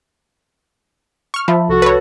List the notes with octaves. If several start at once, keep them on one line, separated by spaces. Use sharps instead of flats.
C#6 F6
F3 E5 A5 B5
C2 F#4 A4
B4 C#5